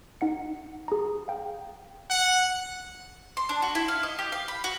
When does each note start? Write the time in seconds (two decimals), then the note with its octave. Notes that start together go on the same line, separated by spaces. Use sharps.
0.21 D#4 F#5 C#7
0.88 G#4 A#5
1.28 F5 G5
2.10 F#5
3.37 C6
3.49 D4
3.62 F#4
3.75 E4
3.88 F5
4.03 D#5
4.19 G4
4.32 F5
4.48 B5
4.64 F#4